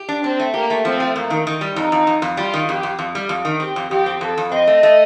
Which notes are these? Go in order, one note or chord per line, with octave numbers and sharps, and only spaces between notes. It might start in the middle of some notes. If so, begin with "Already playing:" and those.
Already playing: G4
D4
C4 D4
A3
A#3 G4
A3
F3 C4
A3
F2 A#3
D#3
D#3
G3
F2 D#4
F2
F2
F2
G3 F4
D#3
F2 G4
F2
F2
G3
F2
D#3
C4 G4
F2
F2 G4
C4
F2 A4
F2
C4 D#5
A3
A3